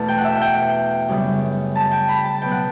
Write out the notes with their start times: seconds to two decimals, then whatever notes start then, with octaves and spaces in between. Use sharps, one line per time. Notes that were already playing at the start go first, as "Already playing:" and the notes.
Already playing: E2 B2 A3 A5
0.08 G5
0.18 F#5
0.25 E5
0.41 G5
1.09 F#2 C#3 G3 B3
1.76 A5
1.91 G5
2.09 B5
2.25 A5
2.42 B2 F#3 B3 G5
2.51 F#5